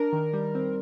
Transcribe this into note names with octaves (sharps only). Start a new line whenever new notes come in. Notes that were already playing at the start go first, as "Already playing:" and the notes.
Already playing: D4 A#4
D#3
G3
C4